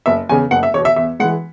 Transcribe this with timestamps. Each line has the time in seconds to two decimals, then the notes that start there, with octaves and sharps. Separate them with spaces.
0.06 F#1 E5
0.29 E2 C#3 G#5
0.51 F#1 F#5
0.63 E5
0.74 E2 B2 C#5
0.85 E5
0.96 E2 E5
1.19 E3 G#3 F#5